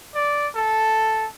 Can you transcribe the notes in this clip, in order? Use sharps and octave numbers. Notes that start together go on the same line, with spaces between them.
D5
A4